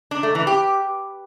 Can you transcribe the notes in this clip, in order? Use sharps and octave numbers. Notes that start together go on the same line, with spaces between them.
D4
A3
E3
G4